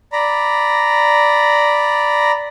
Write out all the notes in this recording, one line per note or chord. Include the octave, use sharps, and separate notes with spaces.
D5 A#5 B5